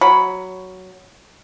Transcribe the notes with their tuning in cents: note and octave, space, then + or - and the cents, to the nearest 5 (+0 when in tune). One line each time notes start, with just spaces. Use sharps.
F#3 +5 B5 +0